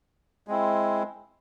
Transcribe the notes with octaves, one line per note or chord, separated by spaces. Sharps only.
G#3 C4 E4